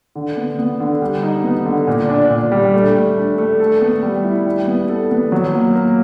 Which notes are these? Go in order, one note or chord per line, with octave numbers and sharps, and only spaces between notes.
D3
B3
B3
D3
G3
D#4
B3
D3
A#2
D4
A#2
G3
A3
A3
D4
A3
A4
B3
G3
E4
G3
B3
A4
B3
F#3
A#3
A#3